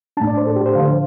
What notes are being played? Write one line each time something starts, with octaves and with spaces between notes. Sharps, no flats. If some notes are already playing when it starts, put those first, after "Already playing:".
A2 A3 D4 A5
D5
C5
A4
G4
C5
D3 F3 D4 F5
C5